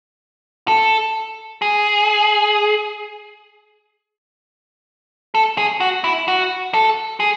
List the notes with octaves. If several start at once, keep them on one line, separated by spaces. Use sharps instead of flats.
A4
G#4
A4
G#4
F#4
E4
F#4
A4
G#4